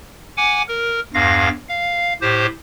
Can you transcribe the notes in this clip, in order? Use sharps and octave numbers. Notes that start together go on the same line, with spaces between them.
F#5 G#5 D6
A#4
E2 G2 F5 A#6
F5
A2 G4 C5